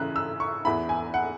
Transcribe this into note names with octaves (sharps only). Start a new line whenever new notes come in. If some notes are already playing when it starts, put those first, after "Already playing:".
Already playing: C#3 E3 C#4 E4 F#6
E6
C#6
E2 E3 B3 E4 B5
G#5
F#5